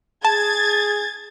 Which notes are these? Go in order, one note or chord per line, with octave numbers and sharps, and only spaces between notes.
G#4 A5 G#6 A6